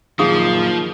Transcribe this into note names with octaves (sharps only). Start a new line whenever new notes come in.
F#2 A#2 D#3 F3 D#4 G#4 F5 D#6